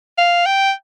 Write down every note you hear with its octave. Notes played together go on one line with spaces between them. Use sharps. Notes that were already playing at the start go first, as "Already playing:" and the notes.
F5
G5